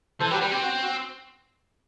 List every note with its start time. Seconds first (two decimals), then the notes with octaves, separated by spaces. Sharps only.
0.20 E3 A4 C5
0.31 F#3 G4 B4
0.41 G3 G4 B4
0.51 C4 G4
0.63 F#4
0.83 F#4